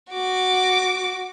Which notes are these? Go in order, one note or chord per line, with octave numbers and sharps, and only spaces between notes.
F#4 D6